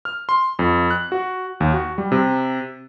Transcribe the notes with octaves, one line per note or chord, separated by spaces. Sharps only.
F6
C6
F2
F#6
F#4
D#2
F#4
G3
C3